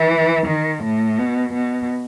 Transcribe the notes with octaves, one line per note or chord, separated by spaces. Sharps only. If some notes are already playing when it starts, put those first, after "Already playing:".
Already playing: E3
D#3
A2
B2
B2